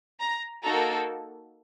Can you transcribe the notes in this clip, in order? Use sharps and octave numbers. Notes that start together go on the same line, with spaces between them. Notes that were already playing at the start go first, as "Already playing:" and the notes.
A#5
A#3 D#4 F#4 A4 A#5